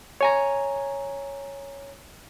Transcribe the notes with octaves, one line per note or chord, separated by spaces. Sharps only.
C#5 G#5 A#5